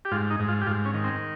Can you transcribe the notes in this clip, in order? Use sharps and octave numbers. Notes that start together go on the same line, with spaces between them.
G4
G#2 F4
D#4
G#2
F4
G4
G#2 F4
C#4
D#3
C4